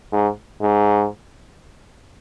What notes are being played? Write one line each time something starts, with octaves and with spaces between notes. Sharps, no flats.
G#2
G#2